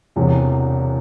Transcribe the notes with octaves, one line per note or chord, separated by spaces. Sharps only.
E1 E2 C3